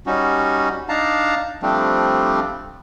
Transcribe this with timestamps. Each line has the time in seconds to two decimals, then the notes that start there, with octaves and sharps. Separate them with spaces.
0.06 G3 C#4 D#4 F#4
0.89 D4 D#4 F5 A5 A#5
1.62 F3 G3 A3 C4 D4